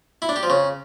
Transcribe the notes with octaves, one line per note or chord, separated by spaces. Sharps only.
E4
D4
G4
F3
C#3